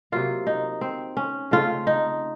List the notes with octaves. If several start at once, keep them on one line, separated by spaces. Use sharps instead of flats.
C3 F#3 A#3 F4
D#4
C4
C#4
C#3 A3 C4 F4
D#4